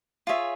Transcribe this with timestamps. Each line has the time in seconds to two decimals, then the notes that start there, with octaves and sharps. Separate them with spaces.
0.27 F4 G#4 C#5 E5